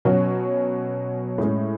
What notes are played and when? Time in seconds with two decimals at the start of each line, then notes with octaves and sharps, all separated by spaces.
0.05 B2 F#3 C#4 F#4
1.38 A2 G#3 C#4